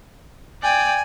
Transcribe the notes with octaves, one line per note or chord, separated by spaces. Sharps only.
D5 G5 G#5